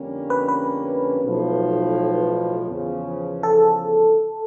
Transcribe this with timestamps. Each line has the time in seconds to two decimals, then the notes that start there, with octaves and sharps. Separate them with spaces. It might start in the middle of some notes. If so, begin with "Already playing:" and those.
Already playing: F2 D3 G3 A#3 C#4
0.30 B4
0.48 B4
1.22 B1 A2 F3
2.70 E2 C#3 F3
3.43 A4